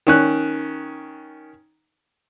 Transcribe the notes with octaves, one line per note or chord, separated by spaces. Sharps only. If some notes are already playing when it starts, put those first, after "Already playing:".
D#3 C#4 F#6